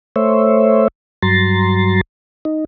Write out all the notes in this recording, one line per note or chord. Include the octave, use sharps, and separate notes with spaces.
A3 C5 C#5 E5
G2 F#3 A#5 C6 A6
D#4